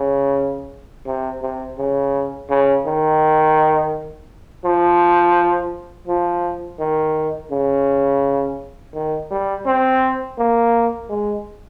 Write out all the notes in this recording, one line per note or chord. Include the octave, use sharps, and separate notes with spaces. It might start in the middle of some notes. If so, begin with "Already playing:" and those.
Already playing: C#3
C3
C3
C#3
C#3
D#3
F3
F3
D#3
C#3
D#3
G3
C4
A#3
G#3